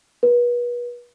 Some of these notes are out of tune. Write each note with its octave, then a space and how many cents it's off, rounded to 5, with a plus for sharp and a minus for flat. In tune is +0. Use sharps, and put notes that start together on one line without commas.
B4 -35